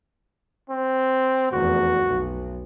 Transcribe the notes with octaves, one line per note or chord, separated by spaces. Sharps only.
C4
F1 E2 F#4
B1